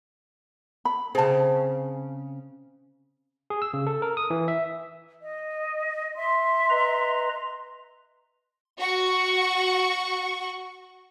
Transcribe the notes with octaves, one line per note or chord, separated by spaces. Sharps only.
B5
C#3 C4 G#4 A5
G#4
E6
C#3
A4
A#4
D#6
E3
E5
D#5
E5 C6
B4 D#5 A#5
F#4 C#6